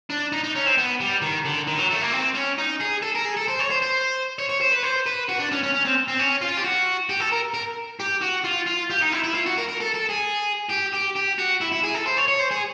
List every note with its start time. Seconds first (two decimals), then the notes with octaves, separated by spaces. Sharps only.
0.10 D4
0.32 D#4
0.44 D#4
0.55 C#4
0.66 C4
0.78 B3
1.00 G3
1.22 D#3
1.45 D3
1.67 D#3
1.78 F#3
1.91 A3
2.02 A#3
2.13 C4
2.35 C#4
2.58 D#4
2.81 G#4
3.03 A4
3.15 A#4
3.25 G#4
3.37 A4
3.48 C5
3.59 C#5
3.70 C5
3.82 C5
4.39 C#5
4.50 C#5
4.61 C5
4.72 B4
4.83 C5
5.06 B4
5.29 F#4
5.40 D4
5.52 C#4
5.63 C#4
5.74 C#4
5.85 C4
6.08 C4
6.19 C#4
6.41 F4
6.57 G4
6.64 F#4
7.09 G4
7.20 A4
7.32 A#4
7.54 A#4
8.00 G4
8.22 F#4
8.45 F4
8.67 F4
8.90 G4
9.02 D#4
9.13 E4
9.24 E4
9.35 F4
9.46 F#4
9.58 A#4
9.69 A#4
9.81 A4
9.95 A4
10.10 G#4
10.70 G4
10.93 G4
11.16 G4
11.39 F#4
11.61 E4
11.72 E4
11.83 G#4
11.94 A4
12.06 C5
12.17 C#5
12.28 C#5
12.39 C5
12.51 G#4